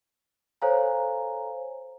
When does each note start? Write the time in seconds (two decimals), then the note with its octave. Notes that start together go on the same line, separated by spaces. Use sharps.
0.62 A4 C5 C#5 F5 G#5 A#5